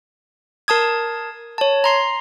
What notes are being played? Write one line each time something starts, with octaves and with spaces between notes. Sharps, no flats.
A#4 A5 D#6 G#6
C#5 A5
A#5 C6 C7